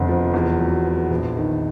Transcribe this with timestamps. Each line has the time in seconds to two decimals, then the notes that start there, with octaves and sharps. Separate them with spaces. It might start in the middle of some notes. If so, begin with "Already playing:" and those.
Already playing: F1 D3 B3
0.09 F3
0.34 E2
0.60 F#3
0.86 B3
1.11 A#1
1.37 D#3